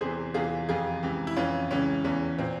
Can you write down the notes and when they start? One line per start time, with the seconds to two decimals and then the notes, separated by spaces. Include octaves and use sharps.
0.01 E2 C3 E3 G#4 C5
0.34 E2 C3 E3 F4 G#4
0.69 F2 C3 E3 F4 G#4
1.03 C#2 C3 E3
1.27 E4
1.36 F2 E3 C#4 F4
1.71 C#2 C#3 E3 C#4
2.04 E2 C#3 E3 C#4
2.38 A#2 C4